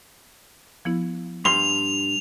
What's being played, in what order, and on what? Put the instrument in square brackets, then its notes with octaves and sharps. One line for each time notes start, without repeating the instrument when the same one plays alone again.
[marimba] F3 B3 E4
[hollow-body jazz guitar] G2 C6 [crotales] F7